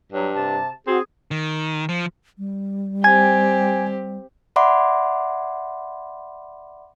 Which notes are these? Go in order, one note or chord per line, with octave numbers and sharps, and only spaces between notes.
G2 F#3
C3 A5
C4 F#4 G#4
D#3
F3
G3
C4 G4 G#5 G#6
D5 E5 F#5 B5 C6 D6